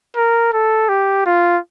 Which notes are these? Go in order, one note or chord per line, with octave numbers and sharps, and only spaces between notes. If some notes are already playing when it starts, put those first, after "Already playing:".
A#4
A4
G4
F4